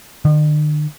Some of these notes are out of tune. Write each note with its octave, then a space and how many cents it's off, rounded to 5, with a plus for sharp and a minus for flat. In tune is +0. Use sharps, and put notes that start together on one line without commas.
D3 +45